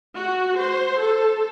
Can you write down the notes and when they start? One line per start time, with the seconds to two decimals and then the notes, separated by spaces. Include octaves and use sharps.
0.15 F#4
0.58 C5
0.99 A4